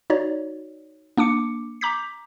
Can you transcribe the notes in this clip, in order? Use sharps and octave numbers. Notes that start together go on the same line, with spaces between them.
D#4 F#4 C#5 D5
A#3 D4 D6 C#7
A#5 D6 G6 B6